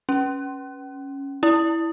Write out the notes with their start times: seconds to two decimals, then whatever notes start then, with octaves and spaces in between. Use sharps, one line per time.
0.09 C#4
1.43 E4